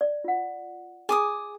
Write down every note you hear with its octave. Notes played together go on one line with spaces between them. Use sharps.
D5
F4 F#5
G#4 G#5 D6 D#6